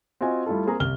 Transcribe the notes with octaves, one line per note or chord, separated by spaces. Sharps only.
C4 F4 F#4 D#5 G#5
G3 A3 E4 F4 A4
A#3 C4 G#4 A#5
C2 F6 G7